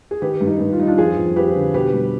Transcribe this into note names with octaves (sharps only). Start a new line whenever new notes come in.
G#4
D#3 G4 B4
G2
D#4
G2
F4
G3 D#4
D4 F4
F2 F4 G#4
F2
F3 G4 B4
D3
B2 G4 B4
G3